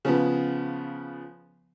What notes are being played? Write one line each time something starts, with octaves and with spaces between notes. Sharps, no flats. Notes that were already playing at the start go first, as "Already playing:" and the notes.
C#3 F3 B3